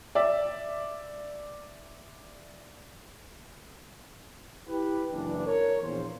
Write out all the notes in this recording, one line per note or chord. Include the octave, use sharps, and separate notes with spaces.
D5 E5
E4 G4 B4
F#1 E3 D4
A#4 C#5
A#1 E2 A#2 C5